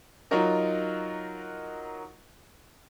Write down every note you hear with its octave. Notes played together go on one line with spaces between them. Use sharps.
F#3 D#4 F4 F#4 A#4 D#5